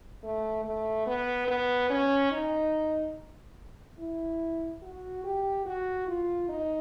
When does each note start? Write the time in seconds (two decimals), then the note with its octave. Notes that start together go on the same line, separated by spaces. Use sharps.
0.23 A3
0.65 A3
1.06 B3
1.48 B3
1.90 C#4
2.32 D#4
3.99 E4
4.82 F#4
5.24 G4
5.66 F#4
6.07 F4
6.49 D#4